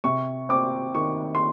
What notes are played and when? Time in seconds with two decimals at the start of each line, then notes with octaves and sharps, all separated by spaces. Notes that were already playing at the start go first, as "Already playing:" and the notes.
0.04 C3 C#6
0.49 C4 D6
0.94 D#3 C#6
1.35 C6